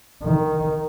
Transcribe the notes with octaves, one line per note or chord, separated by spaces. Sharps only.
D#3